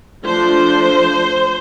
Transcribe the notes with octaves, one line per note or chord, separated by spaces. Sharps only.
F3 A3 D4 C5